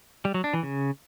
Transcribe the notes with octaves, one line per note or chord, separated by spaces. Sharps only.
G3
F#3
D4
E3
C#3